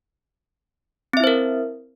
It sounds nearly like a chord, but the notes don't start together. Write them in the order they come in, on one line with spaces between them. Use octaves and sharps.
C4 E5 E4 C5 A#4